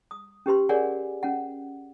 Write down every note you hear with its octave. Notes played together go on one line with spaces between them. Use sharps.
D#6
C#4 G4 B4 C6
G#4 A#4 C#5 D5 F#5 G#5
C#4 F#5